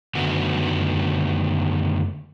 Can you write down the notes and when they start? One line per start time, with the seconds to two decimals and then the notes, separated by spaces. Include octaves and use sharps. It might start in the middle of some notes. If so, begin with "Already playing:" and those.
0.15 F#2 D3 D#3 A3 B3 F#4